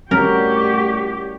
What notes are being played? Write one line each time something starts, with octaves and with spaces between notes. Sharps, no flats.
A2 G3 C#4 F#4 G4 A#4 D5